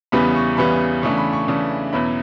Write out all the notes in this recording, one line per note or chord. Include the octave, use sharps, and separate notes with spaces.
E2 C#3 E3 G3 B3 B5
C#6
E2 C#3 E3 G3 B3 B5
C#3 E3 A3 D4 C#6
B5
C#6
C#3 E3 A3 D4
E2 B2 F#3 C#4 E4 B5